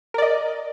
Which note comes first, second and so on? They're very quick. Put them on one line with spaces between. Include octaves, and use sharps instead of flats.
A#4 D5 D#5